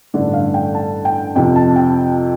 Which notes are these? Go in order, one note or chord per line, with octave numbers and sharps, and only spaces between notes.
A1 G2 D3 A3 D5
F5
G5
A5
G5
F2 C3 F3 G5
A5
G5